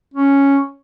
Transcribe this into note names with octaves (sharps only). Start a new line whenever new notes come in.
C#4